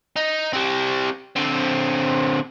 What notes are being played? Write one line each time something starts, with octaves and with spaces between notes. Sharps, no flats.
D#4
G3 C4
D3 C4